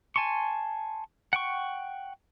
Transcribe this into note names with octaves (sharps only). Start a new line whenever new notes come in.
G#5 A5 C6 C#6
F#5 G5 C#6